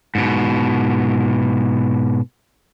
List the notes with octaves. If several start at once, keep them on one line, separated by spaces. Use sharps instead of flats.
G#2 B2